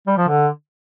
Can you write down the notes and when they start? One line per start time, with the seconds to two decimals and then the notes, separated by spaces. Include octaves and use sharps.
0.07 G3
0.17 F3
0.27 D3